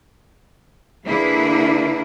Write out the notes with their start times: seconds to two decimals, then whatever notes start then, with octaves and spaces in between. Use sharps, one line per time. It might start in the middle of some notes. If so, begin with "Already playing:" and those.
1.06 D3 A#3 D4 E4 G#4 B4